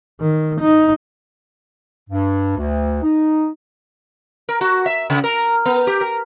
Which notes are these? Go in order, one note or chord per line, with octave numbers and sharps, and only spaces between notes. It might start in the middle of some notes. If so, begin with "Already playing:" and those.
D#3
D#4
G2
D2
D#4
A#4
F#4
E5
C#3
A#4
B3
G4
A#4